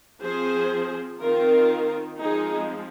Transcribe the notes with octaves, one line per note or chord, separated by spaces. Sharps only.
F3 C4 G#4 C5
D#3 C4 F4 A#4
F3 G#3 C4 D#4 G#4